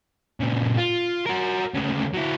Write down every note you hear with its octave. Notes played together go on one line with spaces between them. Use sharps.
A#2 C#3
F4
F#4 A#4
D2 C#3
F#3 E4